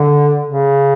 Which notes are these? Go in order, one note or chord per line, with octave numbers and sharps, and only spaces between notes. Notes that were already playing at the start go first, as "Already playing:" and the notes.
Already playing: D3
C#3